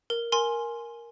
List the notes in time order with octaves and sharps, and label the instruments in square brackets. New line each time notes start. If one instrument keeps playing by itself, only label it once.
[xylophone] A#4
A#4 G#5 C6